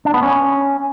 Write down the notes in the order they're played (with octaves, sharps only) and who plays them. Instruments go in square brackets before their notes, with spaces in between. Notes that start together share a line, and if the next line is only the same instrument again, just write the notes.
[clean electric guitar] D4
B3
C#4